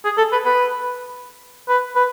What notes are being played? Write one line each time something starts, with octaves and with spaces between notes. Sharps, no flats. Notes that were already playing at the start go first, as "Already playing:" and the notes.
G#4
A4
B4
B4
B4
B4